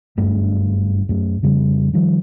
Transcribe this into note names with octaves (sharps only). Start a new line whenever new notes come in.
F#1 G2 A3 D4
F#2 A3
F2 C#3 G3
D#3 F3 G3